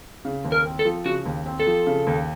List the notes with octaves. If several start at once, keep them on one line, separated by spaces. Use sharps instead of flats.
C#3
D#2
A#4
C4
A4
F3
C#3 F#4
D#2
C4
A4
F3
C#3
D#2